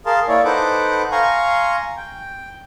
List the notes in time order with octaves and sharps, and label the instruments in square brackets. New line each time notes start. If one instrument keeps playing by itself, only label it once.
[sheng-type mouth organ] G#4 A#4 F5 A5 C6
A#3 E4 C#5 D5
D#4 A4 B4 C5 F#5 D6
F5 G#5 A#5 C6 C#6
G5